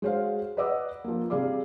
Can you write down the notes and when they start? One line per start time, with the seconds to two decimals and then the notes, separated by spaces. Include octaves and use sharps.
0.02 G#3 F#4 C5 C#5 F5
0.57 B4 D5 D#5 F#5 D6 E6
1.04 F3 A#3
1.30 C3 G3 G#4 D5 F5 D6